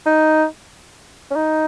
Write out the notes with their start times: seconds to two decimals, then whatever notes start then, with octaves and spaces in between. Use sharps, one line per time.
0.06 D#4
1.31 C#4
1.35 D#4